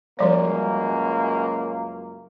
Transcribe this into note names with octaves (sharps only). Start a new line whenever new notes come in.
C#2 F#2 F3 G3 A#3 C#5